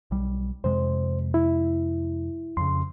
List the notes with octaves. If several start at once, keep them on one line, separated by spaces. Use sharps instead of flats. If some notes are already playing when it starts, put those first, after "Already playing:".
B1 G3
F2 C3 G#3 C5
E4
F2 C#3 C6